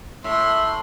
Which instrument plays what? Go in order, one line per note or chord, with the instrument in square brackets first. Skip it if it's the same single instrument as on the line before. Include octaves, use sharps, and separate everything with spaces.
[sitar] A2 [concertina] E5 [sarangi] C6